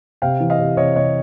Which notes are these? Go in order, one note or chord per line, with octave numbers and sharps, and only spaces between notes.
C3 F5 G5
E3
D#5 F5
C3
C3 C#5 D#5
C3 C#5 D#5